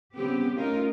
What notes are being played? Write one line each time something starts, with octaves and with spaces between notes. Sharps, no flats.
C#3 G3 B3 C4 G4
A3 C#4 D#4 F4 A#4